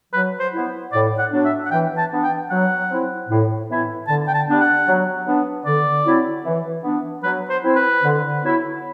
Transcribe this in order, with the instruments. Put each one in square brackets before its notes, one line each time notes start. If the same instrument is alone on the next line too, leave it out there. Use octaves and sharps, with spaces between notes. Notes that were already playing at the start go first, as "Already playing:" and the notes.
[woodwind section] F#3 [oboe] B4
[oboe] C5
[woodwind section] B3 E4
[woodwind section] A2 [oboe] D5
[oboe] F#5
[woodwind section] F#3 B3 D4
[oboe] E5
F#5
[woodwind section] E3 [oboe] G5
[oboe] A5
[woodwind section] B3 D4
[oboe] G5
[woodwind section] F#3 [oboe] F#5
[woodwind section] C4 E4
A2
E3 B3 E4
[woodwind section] D3 [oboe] A5
[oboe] G5
A5
[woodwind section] G3 B3 D4
[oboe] F#5
[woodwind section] F#3
B3 D4
[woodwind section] D3 [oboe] D5
[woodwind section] F#3 C4 E4
E3
B3 D4
[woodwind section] F#3 [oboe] B4
[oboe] C5
[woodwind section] C4 E4
[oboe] B4
[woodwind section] D3
F#3 B3 E4